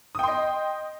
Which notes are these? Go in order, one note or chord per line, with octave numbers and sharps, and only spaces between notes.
D#5 G5 C6 D#6